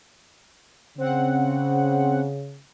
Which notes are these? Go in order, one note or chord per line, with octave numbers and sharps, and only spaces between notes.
C#3 C4 F#5